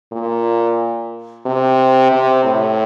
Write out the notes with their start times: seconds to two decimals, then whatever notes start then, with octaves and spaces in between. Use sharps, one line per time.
0.12 A#2
1.46 C3
2.11 C3
2.44 A2